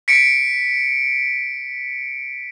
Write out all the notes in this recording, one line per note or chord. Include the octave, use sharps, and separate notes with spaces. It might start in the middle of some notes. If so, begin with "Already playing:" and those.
B6 C#7 D7